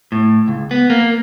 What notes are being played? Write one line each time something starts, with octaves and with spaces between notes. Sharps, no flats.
A2
C#2
B3
A#3